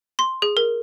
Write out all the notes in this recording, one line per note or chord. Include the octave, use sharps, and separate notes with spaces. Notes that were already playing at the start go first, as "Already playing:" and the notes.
C6
G#4
A#4